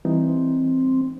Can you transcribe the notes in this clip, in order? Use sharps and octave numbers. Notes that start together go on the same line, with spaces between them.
E3 G3 C4 D#4